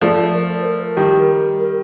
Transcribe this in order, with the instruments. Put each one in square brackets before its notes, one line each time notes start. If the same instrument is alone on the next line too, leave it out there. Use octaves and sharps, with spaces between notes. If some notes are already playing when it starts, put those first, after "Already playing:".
[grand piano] F3 A3 [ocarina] D5
[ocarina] A#4
C5
A#4
[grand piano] D#3 G3
[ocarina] A#4